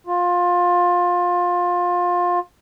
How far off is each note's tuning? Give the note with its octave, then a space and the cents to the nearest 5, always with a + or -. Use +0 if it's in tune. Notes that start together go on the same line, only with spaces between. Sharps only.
F4 +20